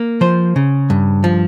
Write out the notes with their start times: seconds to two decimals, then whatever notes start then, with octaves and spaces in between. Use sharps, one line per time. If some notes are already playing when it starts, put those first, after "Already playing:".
Already playing: A#3
0.21 F3 C5
0.56 C#3
0.90 G2
1.24 F3